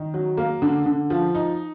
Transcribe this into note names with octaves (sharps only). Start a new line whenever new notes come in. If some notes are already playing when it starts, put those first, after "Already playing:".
Already playing: D#3
F#3
A#3
D3
D3
F3
D#4